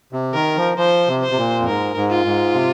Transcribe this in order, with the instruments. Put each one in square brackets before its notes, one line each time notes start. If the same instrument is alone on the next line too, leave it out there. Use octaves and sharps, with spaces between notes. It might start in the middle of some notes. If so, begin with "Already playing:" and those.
[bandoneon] C3
[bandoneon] D#3 [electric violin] A#4
[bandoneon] F3
[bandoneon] F3 [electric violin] C5
[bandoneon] C3
[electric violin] C5
[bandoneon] C3
A#2
F2
[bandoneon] G#2 [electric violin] A#4
[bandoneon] G#2
[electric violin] F4
[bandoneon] G#2
C3